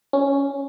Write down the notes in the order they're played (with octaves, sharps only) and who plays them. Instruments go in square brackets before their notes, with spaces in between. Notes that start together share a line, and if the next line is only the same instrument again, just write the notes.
[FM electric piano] C#4